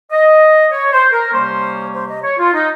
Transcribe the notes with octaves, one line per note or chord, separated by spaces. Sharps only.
D#5
C#5
C5
A#4
C3 G3 A#3 C#4 C5
C5
D#5
C#5
F4
D#4